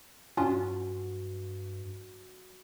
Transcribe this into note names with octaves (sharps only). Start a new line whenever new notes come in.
G2 C#4 D4 F4 F#4